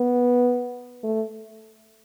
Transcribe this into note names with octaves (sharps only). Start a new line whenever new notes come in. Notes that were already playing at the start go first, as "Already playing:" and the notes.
Already playing: B3
A3